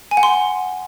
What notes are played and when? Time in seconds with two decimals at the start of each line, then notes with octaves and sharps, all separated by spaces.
0.11 G#5
0.17 F#5
0.23 C6